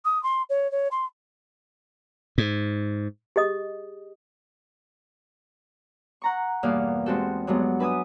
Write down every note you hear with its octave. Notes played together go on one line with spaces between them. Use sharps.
D#6
C6
C#5
C#5
C6
G#2
G4 G#4 D#5 D#6
F#5 A#5 C#6
E2 G2 B2 A#3 F5
G#3 C4 F#4 G4 A4
G2 F#3 G#3 B3
D4 B4 E5 G#5 D#6